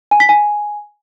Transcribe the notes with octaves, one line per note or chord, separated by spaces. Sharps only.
G#5
B6
G#5